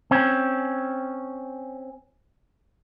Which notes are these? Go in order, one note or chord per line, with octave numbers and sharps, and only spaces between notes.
C4 C#4